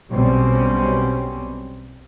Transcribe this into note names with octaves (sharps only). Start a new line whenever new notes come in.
B1 B2 G3 C4 C#4